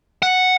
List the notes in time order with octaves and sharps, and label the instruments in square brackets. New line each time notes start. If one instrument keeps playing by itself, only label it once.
[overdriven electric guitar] F#5